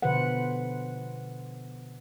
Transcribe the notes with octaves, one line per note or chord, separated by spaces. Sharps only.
B2 D3 F3 B4 C5 F#5